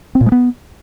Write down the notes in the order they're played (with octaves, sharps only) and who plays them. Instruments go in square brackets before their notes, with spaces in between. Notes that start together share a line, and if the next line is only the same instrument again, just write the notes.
[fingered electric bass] C4
A#2
G#3
B3